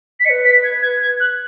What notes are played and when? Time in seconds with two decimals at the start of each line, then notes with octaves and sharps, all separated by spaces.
0.20 B6
0.25 D#5 C#7
0.30 B4
0.45 B6
0.64 G#6
0.82 G#6
1.01 G#6
1.20 F#6